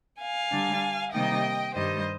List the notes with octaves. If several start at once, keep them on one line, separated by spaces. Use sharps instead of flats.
F5 G#5
D3 G3 D4
C3 D#3 G3 A#3 D#4 D#5 G5
G2 D#3 G3 C5 D#5